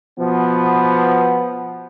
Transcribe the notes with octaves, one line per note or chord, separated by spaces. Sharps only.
B2 F3 B3